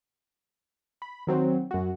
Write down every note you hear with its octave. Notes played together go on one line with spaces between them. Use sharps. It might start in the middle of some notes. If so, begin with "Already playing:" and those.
B5
D#3 F#3 C4
F#2 F#4